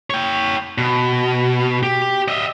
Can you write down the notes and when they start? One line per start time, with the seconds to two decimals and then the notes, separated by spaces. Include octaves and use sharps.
0.10 C#5 G5
0.78 B2
1.83 G4
2.28 D#5 E5